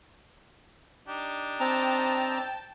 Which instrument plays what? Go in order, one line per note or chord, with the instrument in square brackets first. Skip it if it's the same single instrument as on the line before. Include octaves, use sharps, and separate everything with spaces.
[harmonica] D4 D#4 G4
[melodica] C4 A#5 [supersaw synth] G5 A5